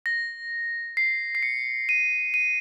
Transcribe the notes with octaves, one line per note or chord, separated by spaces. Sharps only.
A#6
C7
C7
C#7
D#7
D#7